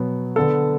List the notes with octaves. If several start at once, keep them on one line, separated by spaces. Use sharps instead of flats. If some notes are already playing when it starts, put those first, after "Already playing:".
Already playing: B2 F#3 B3
D3 B3 A4